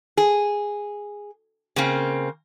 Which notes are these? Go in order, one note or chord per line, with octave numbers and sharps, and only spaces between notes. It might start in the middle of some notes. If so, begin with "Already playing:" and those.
G#4
C#3 A#3 C4